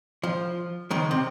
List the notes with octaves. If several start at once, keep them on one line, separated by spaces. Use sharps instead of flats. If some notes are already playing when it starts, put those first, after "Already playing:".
F3
C#2 D#3 G#3
C3